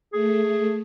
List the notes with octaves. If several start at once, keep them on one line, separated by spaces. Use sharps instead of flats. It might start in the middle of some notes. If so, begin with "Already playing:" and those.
A3 G#4